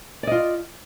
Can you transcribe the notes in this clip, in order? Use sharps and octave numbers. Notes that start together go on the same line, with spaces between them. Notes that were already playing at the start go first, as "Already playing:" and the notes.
F4 D5 D#5